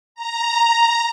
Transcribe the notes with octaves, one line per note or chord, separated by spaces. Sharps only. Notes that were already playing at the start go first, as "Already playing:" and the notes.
A#5